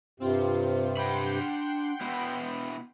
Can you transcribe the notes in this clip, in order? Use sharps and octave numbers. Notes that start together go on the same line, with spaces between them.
G2 C3 C4 F4
D4 F#5 G5 B5 C6
B2 B3 E4